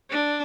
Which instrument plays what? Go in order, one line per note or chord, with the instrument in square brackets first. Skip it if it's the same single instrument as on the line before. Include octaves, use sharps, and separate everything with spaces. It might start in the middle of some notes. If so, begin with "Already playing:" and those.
[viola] D4